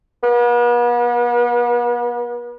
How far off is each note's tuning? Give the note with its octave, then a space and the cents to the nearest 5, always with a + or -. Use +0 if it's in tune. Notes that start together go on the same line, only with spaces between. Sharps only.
B3 -40